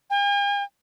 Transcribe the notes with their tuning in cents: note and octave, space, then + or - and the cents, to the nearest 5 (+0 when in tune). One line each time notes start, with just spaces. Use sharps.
G#5 -45